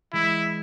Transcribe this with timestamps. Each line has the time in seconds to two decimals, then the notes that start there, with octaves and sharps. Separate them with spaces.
0.13 E3 G#3 E4